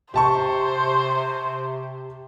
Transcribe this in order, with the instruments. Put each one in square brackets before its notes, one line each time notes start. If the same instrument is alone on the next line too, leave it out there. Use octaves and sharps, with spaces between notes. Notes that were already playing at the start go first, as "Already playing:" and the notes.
[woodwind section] C3 [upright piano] G4 A5 C#6 [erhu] C5